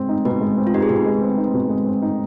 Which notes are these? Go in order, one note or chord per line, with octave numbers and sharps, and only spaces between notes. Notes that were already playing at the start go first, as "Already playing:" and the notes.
Already playing: G#3 C4
D#4
B2 B4
G#3
C4
F4
D#4 G4
G#4
B2 B4
G#3
C4
D#4
B2
G#3
C4
D#4